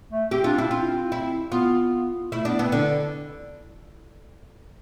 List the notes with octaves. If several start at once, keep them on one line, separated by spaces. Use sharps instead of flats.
A3
C4 G4
D4 F4
C4 E4
C4 F4
E4
B3 F4
A3 E4
B3 D4
B3 C4
D3 D4